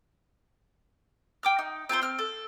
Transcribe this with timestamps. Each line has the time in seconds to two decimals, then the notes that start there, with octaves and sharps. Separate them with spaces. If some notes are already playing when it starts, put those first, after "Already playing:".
1.43 G5 D6 F6
1.59 D#4
1.89 C4 F4 A#4 C5
2.02 C4 F6
2.19 A4